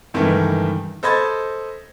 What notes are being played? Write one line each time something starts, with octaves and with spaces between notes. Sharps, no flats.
C#2 G2 D#3 E3 A3
A4 C5 D#5 B5 G#6 A6